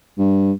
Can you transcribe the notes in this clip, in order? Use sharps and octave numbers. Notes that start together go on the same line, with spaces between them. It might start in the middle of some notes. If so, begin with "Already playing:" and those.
G2